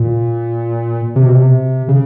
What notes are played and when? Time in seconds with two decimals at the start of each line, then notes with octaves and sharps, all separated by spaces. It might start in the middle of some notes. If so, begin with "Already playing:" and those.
Already playing: A#2
1.16 C3
1.25 B2
1.36 C3
1.88 C#3